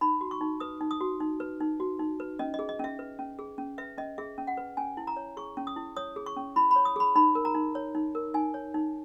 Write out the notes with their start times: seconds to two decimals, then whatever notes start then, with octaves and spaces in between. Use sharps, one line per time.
0.01 D#4 B5
0.21 F#4
0.31 C#6
0.41 D#4
0.60 B4 D#6
0.81 D#4
0.91 D#6
1.00 F#4
1.20 D#4
1.40 B4
1.60 D#4
1.80 F#4
1.99 D#4
2.20 B4
2.39 C#4 D#5
2.54 D#5
2.59 G#4
2.69 D#5
2.79 C#4 E5
2.99 B4
3.19 C#4
3.39 G#4
3.58 C#4
3.78 B4 E5
3.98 C#4 D#5
4.18 G#4 E5
4.38 C#4
4.47 F#5
4.57 B4
4.77 C#4 G#5
4.97 E4
5.07 A#5
5.16 C#5
5.37 G#4 C#6
5.57 C#4
5.67 D#6
5.76 E4
5.97 C#5 D#6
6.16 G#4
6.26 C#6
6.36 C#4
6.56 E4 B5
6.71 B5
6.76 C#5
6.85 D#6
6.96 G#4 B5
7.16 D#4 B5
7.35 A#4
7.45 A#5
7.55 D#4
7.75 C#5
7.95 D#4
8.15 A#4
8.34 D#4 G#5
8.54 C#5
8.74 D#4